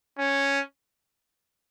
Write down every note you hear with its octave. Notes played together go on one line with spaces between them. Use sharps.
C#4